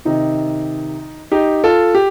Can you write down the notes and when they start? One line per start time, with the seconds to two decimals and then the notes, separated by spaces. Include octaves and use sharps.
0.05 C3 D#3 D#4
1.32 D#4 G4
1.64 F4 A4
1.95 G4